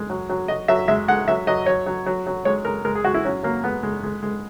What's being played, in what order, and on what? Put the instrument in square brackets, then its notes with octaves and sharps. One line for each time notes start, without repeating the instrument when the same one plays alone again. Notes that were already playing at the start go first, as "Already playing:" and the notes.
Already playing: [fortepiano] G#3
F#3
F#3
F#3 D#5
F#3 E5
G#3 E5
G#3 F#5
F#3 E5
F#3 D#5
F#3 C#5
F#3
F#3
F#3
G#3 C#5
G#3 A#4
G#3 A#4
G#4
G#3 F#4
E4
F#3 C#4
F#3 A#3
G#3 B3
G#3
G#3
G#3